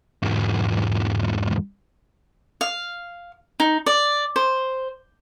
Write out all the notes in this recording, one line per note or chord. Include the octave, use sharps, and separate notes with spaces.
E2 G#2
F5
D#4
D5
C5